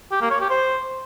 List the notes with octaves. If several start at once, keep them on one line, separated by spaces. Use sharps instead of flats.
G4
A#3
C#5
G4
C5